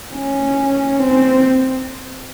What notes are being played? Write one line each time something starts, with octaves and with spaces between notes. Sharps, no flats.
C#4
C4